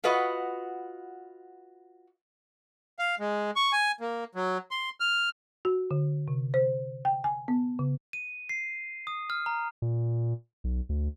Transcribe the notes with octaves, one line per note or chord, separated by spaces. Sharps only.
F4 F#4 B4 D#5 F#5
F5
G#3
C#6
G#5
A#3
F#3
C6
F6
F#4
D3
C3
C5
G5
G#5
B3
C#3
D#7
C7
D#6
F6
A#5
A#2
B1
D2